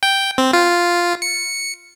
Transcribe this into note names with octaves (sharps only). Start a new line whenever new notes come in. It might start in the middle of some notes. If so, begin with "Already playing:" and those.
G5
C4
F4
C#7